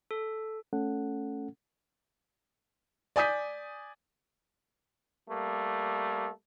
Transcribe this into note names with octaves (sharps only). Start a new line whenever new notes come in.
A4
A3 C#4 A4 F#5
D5 G#5 D#6 G6 B6
G3 A3 A#3